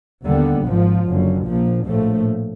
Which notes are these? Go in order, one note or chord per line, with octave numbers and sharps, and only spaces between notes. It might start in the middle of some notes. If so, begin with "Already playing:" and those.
D#2 D3 G3 B3
G#1 G#2 F3
F#1 F#2 D3
A#1 A#2 F3
A#1 A2 F3 A3